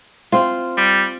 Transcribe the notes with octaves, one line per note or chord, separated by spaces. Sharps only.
C4 F4
G3